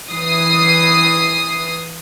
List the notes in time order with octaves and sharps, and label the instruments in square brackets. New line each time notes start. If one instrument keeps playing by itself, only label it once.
[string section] E3 D#6 C7